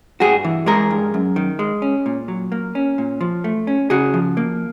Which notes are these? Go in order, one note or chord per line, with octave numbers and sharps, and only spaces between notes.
G2 F#4 G#4
E3
G#3 G#4 A#4
G2
F#2
D#3
G#3
C#4
A#2
F#3
A#3
C#4
A#2
F3
A3
C#4
C#3 F#4 G#4
F3
A#3